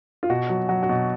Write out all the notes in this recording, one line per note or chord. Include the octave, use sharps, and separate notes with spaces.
F4
B2 F#4
F#3
F#3 F#4
F#4
B2